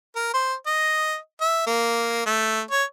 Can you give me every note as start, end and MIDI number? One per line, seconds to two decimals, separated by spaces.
0.16 0.32 70
0.34 0.54 72
0.66 1.16 75
1.41 1.64 76
1.67 2.25 58
2.26 2.61 57
2.71 2.84 73